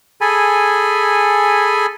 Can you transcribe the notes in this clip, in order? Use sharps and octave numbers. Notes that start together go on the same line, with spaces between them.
G#4 A4 G#5 B5